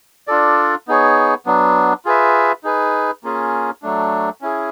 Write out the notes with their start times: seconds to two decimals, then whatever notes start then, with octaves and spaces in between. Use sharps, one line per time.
0.28 D4 F4 A4 D5
0.88 B3 D#4 G#4 C#5
1.46 F#3 B3 D4
2.05 F4 G#4 B4 E5
2.64 D#4 G#4 B4
3.24 A#3 C#4 F4 G#4
3.82 F#3 A3 D4
4.41 C#4 E4 G#4